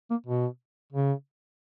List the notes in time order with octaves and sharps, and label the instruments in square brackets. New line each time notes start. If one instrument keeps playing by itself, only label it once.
[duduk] A#3
B2
C#3